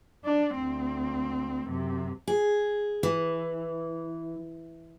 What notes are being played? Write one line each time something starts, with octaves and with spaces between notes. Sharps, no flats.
D4
D2 C4
F#2 C3
G#4
E3